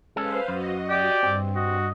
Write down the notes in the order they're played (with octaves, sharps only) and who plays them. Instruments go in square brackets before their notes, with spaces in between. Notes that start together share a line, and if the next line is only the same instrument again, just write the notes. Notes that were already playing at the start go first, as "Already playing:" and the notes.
[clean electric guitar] G#3 C#4 A4 [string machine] B4 C5 F5
[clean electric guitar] F#2 [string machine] F#4 D#5
[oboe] G4 [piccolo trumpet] D5
[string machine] G2 [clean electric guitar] C4
[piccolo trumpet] F#4 [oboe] D#5